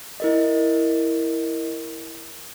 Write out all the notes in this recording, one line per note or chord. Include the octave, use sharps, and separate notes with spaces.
E4 A#4 D#5